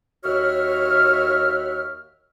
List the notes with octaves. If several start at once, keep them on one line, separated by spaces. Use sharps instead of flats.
D#2 F#4 C#5 E5 F6